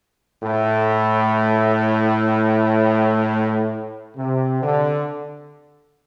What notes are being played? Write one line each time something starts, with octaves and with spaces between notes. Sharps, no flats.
A2
C3
D3